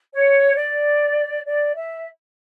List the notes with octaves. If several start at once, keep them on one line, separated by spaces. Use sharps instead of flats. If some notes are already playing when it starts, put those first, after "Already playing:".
C#5
D5
D5
E5